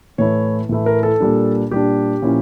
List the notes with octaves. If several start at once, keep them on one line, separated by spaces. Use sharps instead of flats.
A2 E3 A3 E4 C#5
A2 E3 A3 E4
A#4
A4
A#2 G3 D4
A#2 G3 D4 G4
A#2 F3 A#3 C#4 E4